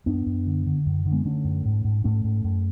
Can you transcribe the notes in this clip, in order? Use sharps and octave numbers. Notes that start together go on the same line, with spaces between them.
F#2 B3 D4
F#2
D3
D3
F#2
D3
G#3 B3
D3 A3 C#4
F#2
G#2
G#2
G#2 A3 C#4
G#2
F#2